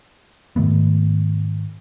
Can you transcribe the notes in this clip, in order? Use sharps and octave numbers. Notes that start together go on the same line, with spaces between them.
G#2 D#3 A3 B3